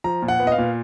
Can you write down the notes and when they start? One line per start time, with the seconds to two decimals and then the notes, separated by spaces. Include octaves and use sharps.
0.04 F3 A#5
0.22 A#2
0.28 F#5
0.40 B3
0.47 D#5
0.52 F5
0.58 A#2